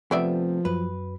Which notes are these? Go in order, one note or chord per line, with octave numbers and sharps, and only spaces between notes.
C3 F3 A3 B3 D5 E5
F#2 F#3 B4